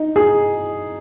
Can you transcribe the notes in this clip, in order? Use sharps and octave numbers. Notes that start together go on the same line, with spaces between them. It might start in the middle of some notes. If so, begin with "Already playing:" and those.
Already playing: D#4
G#4